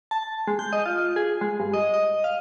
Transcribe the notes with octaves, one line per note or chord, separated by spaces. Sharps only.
A5
G#3
G6
D#5
F4
G#4
G#3
G2
D#5
D#5
F5